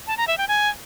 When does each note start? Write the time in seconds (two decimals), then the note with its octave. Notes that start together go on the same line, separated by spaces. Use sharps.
0.07 A5
0.17 A#5
0.28 E5
0.38 G5
0.48 G#5